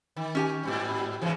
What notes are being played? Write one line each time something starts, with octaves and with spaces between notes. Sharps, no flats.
D#3
C#4 G4 G#5
G#2 B2 G3
G#2 C#3 E3